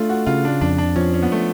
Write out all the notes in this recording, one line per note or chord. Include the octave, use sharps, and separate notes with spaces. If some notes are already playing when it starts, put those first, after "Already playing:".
Already playing: A3 D4 F4
F#4
C#3 F4
D4
F2 D4
D4
F3 C#4
C#4
B3
A3